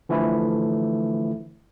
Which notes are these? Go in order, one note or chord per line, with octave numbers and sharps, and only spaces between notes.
D3 E3 F3 A3 E4